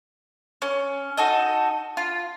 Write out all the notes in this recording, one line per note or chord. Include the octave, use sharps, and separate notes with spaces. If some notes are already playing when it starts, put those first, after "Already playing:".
C#4
D#4 F#4 A4 D#5
F4